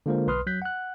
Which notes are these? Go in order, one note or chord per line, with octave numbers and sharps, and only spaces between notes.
D3 G#3 A#3 F4 A#4 C5
B1 B4 C6 D#6 F6
F#3 F#6 G6 B6
F#5 F#6